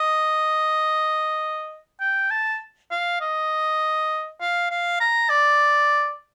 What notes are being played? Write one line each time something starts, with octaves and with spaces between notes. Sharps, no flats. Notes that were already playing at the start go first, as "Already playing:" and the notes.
Already playing: D#5
G5
A5
F5
D#5
F5
F5
A#5
D5